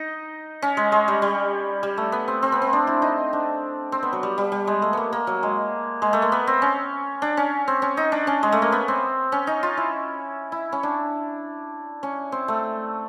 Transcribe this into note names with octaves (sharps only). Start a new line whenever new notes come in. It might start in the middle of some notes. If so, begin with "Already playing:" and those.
Already playing: D#4
C#4
G#3
G#3
G3
G3
G3
A3
B3
C4
C4
B3
C4
D4
E4
D#4
D4
C4
B3
F#3
G3
G3
G3
G#3
A3
A#3 B3
A#3
F#3
G#3
G#3
A3
A#3
B3
C4
C#4
D4
C#4
C4
C#4
D#4
D4
C#4
G#3
A3
A#3
B3
C4
C#4
D#4
F4
E4
E4
C#4
D4
C#4
C4
A3